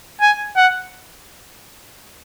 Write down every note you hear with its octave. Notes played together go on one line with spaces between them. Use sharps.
G#5
F#5